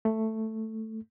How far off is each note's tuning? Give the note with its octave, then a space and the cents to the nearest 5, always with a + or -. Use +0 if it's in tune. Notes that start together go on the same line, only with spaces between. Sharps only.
A3 +5